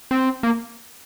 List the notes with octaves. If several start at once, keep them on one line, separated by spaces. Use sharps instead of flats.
C4
A#3